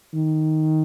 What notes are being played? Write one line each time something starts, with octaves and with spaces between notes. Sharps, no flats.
D#3